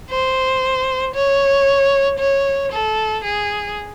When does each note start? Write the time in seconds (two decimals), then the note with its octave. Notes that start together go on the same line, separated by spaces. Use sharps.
0.10 C5
1.14 C#5
2.19 C#5
2.72 A4
3.24 G#4